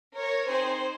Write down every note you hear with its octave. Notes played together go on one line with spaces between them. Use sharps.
A#4 C#5
C4 D#4 G#4 C5